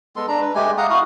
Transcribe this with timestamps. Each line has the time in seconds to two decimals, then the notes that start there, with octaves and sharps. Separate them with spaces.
0.16 G#3 B3 A4 C6
0.28 D4 A#5
0.41 B4
0.55 G#3 A3 G4 G#5
0.78 F5 F#5 A#5 D#6
0.90 E4 F#4 F5 D#6